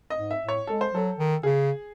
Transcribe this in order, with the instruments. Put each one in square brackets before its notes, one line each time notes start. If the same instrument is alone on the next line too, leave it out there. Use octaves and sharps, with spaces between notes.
[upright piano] D#5
[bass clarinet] G#2
[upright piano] E5
[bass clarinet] A2
[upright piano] C#5
[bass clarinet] G#3 [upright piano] A4
[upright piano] C5
[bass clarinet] F#3 [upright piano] A4
[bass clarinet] D#3
[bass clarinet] C#3 [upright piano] G#4